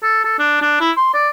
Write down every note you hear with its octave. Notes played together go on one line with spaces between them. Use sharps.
A4
A4
D4
D4
E4
C6
D5